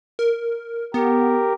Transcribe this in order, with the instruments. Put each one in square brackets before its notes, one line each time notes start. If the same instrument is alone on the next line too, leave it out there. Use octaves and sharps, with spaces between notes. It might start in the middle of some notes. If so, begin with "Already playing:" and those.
[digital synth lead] A#4
[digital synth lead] B3 [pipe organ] G4 A#4